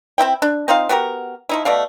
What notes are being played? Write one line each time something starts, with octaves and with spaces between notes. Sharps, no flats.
C4 D#4 E4 G5
D4
C4 D#4 F4 F5
B3 F#4 G4 A#4
F3 D#4 E4
B2 A3 D5 F5